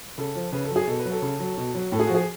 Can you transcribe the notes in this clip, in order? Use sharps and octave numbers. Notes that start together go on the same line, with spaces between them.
C#3 A4
F3
C#3 B4
A4
F#3
G#4
B2 A4
B4
F#3
A4
C#3
F#3
B2
F#3
A2 A4
G#4
F3 F#4
G#4